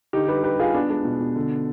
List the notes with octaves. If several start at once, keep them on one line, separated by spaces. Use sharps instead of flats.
D3 D#4 G4
G3 G4 B4
G3 G4 B4
G3 F4 G#4
B3 D4
G#3 D4
B2
B2
D3